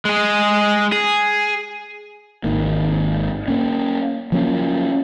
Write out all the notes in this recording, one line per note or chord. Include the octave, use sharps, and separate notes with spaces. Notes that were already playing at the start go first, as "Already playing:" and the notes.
G#3 G#4
G#4
G#1 D#3 A#3
A#3 C#4
F3 F#3 A#3 C#4